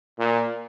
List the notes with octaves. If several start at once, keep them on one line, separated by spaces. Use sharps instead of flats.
A#2